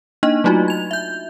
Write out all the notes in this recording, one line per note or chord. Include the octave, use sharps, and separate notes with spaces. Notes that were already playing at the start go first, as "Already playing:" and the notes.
A#3 D4 D#4 D#5
F#3 A3 D#4 F4 F#4
G#6 F7
E5 G6